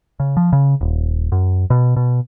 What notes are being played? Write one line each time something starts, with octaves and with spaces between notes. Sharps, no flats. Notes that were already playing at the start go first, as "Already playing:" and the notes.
C#3
F3
C#3
D#1
F#2
B2
B2